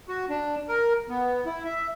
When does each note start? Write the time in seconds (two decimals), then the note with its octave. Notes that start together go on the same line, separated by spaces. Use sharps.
0.08 F#4
0.29 D4
0.69 A#4
1.09 B3
1.46 E4
1.65 E5